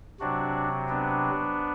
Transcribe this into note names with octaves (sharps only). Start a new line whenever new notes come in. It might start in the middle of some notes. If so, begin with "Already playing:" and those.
C3 F#3 D4 F#4
B3 D4